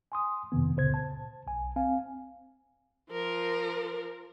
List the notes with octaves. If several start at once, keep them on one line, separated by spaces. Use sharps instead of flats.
G#5 C6 D#6
F2 C3 D#3 B3
C#2 A#2 C#3 C5 G#6
A5
B1 G#5
C4 F5 G#5
F3 A#4